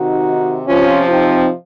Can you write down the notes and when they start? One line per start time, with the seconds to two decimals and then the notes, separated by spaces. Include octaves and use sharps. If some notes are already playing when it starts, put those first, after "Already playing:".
Already playing: C3 D#3 D#4 F#4
0.67 C3 F3 C#4 F4
1.09 C4 D#4